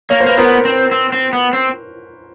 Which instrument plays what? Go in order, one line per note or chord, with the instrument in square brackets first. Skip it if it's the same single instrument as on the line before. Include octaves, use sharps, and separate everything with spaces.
[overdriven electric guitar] A#3 [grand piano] C#5
[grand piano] C5
[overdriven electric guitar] A#3 [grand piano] B4
[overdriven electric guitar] B3 [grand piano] A#4 C5
[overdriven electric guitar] C4
C4
C4
B3
C4